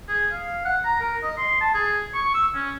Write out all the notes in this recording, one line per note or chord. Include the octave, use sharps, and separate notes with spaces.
G#4
F5
F#5
A#5
A#4
D#5
C6
A5
G#4
C#6
E6
C#4